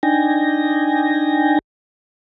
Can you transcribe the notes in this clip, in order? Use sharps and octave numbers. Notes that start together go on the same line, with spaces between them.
D4 D#4 G5 G#5 A#6